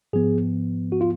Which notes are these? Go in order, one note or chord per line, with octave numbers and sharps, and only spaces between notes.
G#2 F3 B3 G#4
F#4
F4